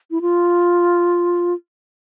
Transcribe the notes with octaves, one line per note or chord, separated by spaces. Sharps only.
E4
F4